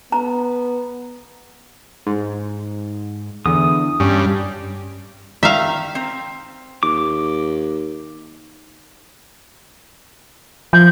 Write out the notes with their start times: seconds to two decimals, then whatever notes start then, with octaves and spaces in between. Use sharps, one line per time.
0.12 B3 A#5
2.06 G#2
3.46 E2 D3 D#6
4.00 G2 C#4
5.43 D#3 E5 F5 A#5
5.95 C4
6.83 D#2 D6
10.73 F3 G6